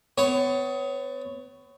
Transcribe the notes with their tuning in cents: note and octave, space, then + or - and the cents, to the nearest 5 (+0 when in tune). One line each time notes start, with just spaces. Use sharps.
B3 +35 C#5 +0